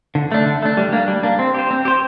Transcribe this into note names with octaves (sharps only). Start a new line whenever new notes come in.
D3
A3 D4
D3
A3 D4
G3
A#3 D4
G3
A#3 D4
C4
G4 C5
C4
G4 C5